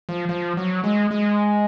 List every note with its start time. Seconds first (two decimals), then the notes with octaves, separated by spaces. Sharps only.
0.09 F3
0.29 F3
0.57 F#3
0.84 G#3
1.11 G#3